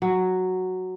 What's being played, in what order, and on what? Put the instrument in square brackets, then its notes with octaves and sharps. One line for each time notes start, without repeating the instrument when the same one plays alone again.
[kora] F#3